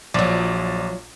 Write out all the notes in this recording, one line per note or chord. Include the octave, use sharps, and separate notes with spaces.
A#1 F3 F#3 D5